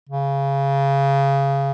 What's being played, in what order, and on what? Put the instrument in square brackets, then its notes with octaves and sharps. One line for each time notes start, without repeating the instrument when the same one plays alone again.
[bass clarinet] C#3